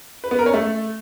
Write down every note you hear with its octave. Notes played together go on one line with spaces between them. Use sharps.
B4
B3
A#4
C#4
A3